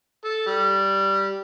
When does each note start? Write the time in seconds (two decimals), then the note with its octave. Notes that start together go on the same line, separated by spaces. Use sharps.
0.24 A4
0.46 G3